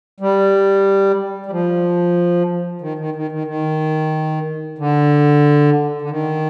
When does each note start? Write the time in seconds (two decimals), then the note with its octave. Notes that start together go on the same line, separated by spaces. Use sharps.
0.20 G3
1.46 G3
1.51 F3
2.82 D#3
2.99 D#3
3.15 D#3
3.32 D#3
3.48 D#3
4.79 D3
6.02 D3
6.10 D#3